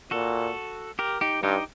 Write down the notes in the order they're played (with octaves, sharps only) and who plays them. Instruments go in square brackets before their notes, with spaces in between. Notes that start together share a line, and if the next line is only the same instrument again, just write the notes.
[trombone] A#2 [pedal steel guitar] F#4 A4
[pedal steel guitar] G4 A#4
D#4 G4
[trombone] G2 [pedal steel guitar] D#4 G4